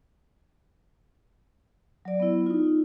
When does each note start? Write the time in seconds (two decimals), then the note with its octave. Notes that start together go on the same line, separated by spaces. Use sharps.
2.05 F#3 D5
2.20 B3 E4
2.46 D#4 F4